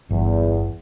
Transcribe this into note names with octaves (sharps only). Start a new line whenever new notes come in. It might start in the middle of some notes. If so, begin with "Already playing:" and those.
G1 E2